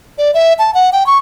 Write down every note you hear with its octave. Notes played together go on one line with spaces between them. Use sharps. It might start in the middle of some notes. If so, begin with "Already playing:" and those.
D5
E5
A5
F#5
G5
C#6